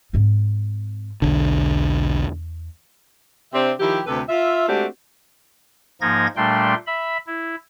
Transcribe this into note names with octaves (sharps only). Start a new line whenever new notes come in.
G#2 C4
B1 E2 D3
C3 C4 D4 G4 C5 E5
D#3 F3 E4 G4
D2 C3 G4 A4 B4
F4 E5
G#3 A3 C4 D4 F#4 G4
G#2 F3 A#3 D#4 G#6 A#6
A#2 G3 A3 D4 G5 C6
E5 B5
E4